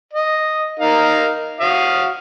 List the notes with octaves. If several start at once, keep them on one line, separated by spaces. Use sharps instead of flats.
D#5
D#4 A#4 F5
F#4 F5 D#6